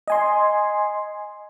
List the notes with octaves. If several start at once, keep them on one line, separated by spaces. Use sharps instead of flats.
D#5 G#5 C6